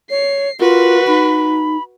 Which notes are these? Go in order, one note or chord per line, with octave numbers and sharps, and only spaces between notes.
C#5 C7
F4 F#4 A#4 B4
D#4 B5